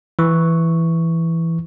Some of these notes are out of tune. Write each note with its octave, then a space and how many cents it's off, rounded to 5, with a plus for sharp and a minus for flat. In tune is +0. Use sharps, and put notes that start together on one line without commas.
E3 +5 C#6 +0